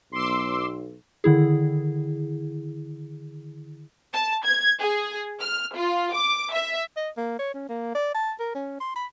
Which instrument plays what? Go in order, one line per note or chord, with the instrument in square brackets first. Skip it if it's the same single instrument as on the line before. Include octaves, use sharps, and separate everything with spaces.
[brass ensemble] B1 [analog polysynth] C6 D6 E6
[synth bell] D3 D#3 E4 G#4
[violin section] A5
G#6
G#4
F6
F4
D6
E5
[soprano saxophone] D#5
A#3
C#5
C#4
A#3
D5
A5
A#4
C#4
C6
B5